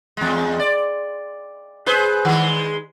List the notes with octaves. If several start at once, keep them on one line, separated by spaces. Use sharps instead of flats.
E2 G#3
D5
G#4 B4 C5
D#3 G#3